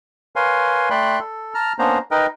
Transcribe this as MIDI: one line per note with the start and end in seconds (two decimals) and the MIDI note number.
0.36 0.89 70
0.36 0.89 71
0.36 0.89 73
0.36 0.89 77
0.36 0.89 80
0.36 0.89 84
0.90 1.19 57
0.90 1.19 74
0.90 1.19 79
0.90 1.19 83
0.90 1.19 84
0.90 1.19 90
1.19 1.54 69
1.54 1.73 81
1.54 1.73 82
1.54 1.73 89
1.79 1.98 58
1.79 1.98 59
1.79 1.98 61
1.79 1.98 62
1.79 1.98 72
1.79 1.98 82
2.11 2.27 63
2.11 2.27 70
2.11 2.27 71
2.11 2.27 75
2.11 2.27 79